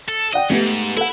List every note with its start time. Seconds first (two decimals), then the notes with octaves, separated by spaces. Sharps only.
0.09 A4
0.33 D5 D#5 F#5 G5
0.50 G#2 A3 B3 G4
0.97 E4 A4 F#5